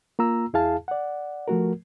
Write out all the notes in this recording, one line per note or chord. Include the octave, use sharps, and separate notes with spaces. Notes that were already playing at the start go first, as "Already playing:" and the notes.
A#3 F4 A#5 E6
E2 E4 G#4 F5 A5
D5 F#5
F3 A3 F#4 A#4